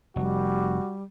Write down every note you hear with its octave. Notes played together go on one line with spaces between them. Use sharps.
F1 G3 F#4